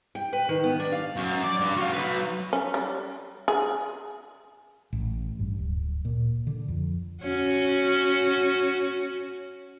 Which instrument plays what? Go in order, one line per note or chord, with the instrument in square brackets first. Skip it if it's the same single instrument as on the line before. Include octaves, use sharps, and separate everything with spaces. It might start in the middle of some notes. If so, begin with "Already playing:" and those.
[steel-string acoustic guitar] G5
B4
D#3
B3
D4
F5
[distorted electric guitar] F#2
D5
G2
F#4 F5
F#3 B4
[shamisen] C#4
G3
G#4
[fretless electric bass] A1
G2
D1
A#2
D3
F2
[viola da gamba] C#4 F#4